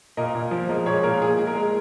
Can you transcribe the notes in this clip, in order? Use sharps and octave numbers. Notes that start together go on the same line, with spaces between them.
A#2 A#4 D#5
A#2
F3
G#3 A#4 D#5
A#2 G#4 C#5
A#2 A#4
A#2 G#4
G#3
A#4
G#3